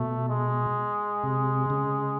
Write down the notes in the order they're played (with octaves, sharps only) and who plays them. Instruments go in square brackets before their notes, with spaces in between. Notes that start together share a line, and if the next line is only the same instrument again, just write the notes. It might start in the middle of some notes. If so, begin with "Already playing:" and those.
Already playing: [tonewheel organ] B2 [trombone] A3
[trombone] G#3
[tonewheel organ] C3
C#3